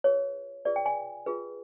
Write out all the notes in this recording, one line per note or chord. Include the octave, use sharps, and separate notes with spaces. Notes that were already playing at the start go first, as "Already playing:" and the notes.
F4 G#4 B4 C#5
F4 G#4 B4 D5
G5
G#5
F4 G#4 B4